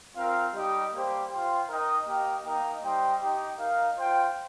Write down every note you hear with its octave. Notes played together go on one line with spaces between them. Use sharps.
C4 F4 A#4 F5
G3 D#4 G4 D#5
G3 A#3 G4 C5
F4 C5 G5
D#4 A#4 D#5 G5
A#3 G4 A#4 D#5 G5
A#3 D#4 A#4 D#5 G5
G3 D#4 C5 D#5 G5
D#4 G4 D#5 G5
D#4 A#4 F5
F4 C5 G5